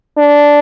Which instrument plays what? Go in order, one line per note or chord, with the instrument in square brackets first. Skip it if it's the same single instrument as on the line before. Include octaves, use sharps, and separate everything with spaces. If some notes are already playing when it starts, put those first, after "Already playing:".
[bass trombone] D4